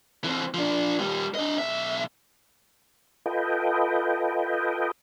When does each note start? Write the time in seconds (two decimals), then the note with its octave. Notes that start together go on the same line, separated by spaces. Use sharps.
0.24 E3 C4
0.54 F3 D4
0.99 D#2 G3
1.35 D4 D#5
1.58 B1 E5
3.26 F4 A4 B4 D#5 G5